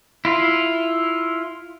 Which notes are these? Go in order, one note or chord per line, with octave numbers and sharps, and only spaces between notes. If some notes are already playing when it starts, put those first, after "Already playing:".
E4 F4